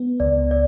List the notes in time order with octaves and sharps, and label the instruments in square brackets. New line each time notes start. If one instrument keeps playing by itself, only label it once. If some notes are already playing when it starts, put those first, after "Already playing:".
Already playing: [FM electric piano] B3
[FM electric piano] C#2 [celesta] D5
[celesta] D5